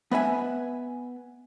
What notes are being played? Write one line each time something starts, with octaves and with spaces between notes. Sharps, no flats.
B3 B4 E5 G#5